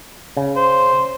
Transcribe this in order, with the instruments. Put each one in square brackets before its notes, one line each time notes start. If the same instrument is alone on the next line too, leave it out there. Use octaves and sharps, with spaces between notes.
[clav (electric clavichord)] C#3
[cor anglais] C5